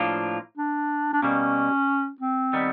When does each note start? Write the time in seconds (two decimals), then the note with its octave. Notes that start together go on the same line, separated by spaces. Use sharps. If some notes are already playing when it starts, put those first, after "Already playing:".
Already playing: A2 F3 A#3 D4 F4
0.57 D4
1.13 D4
1.22 B2 G3 A#3 C#4
2.21 C4
2.53 D#3 G3 B3